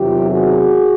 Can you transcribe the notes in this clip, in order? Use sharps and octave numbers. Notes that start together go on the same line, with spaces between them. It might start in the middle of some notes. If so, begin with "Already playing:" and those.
Already playing: E2 C3 D#3 F#3 F4 G4
F#4 G#4